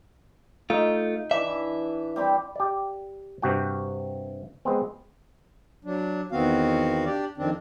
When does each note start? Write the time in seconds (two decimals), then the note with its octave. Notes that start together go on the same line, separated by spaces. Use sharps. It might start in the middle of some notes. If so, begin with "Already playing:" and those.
0.70 A3 D#4 F4
1.31 E3 D4 E5
2.16 G3 C4 B5
2.56 G4 D5
3.42 G2 C3 F#4 G5
4.65 G#3 B3 C4
5.85 F#3 D4
6.32 E2 D#3 B3 C4 F#4 F5
7.05 D4 G4 D5
7.37 F2 D#3 C4 D4